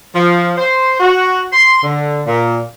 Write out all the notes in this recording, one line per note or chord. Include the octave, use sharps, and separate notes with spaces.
F3
C5
F#4
C6
D3
A#2